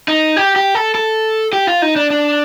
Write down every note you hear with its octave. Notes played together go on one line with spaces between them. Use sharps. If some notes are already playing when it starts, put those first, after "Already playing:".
D#4
G4
G4
A4
A4
G4
F4
D#4
D4
D4